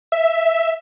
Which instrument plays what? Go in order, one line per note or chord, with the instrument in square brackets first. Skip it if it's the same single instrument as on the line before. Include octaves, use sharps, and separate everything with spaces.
[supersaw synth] E5